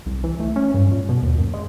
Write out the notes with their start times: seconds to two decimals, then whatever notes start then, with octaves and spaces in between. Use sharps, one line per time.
0.06 C2
0.24 E3
0.40 A3
0.56 C#4
0.74 G2
0.91 A#2
1.09 B2
1.23 D#2
1.38 F#2
1.54 G#3